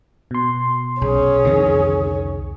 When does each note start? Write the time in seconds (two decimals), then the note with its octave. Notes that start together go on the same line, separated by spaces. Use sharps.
0.31 B2 C6
1.01 B1 C3 C#4 G#4
1.45 C2 F2 D3 D#3 C4